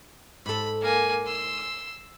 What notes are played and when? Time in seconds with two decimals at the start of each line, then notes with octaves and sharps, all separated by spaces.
0.46 G#2 A4 B5
0.81 A#3 G#5
1.26 C6 E6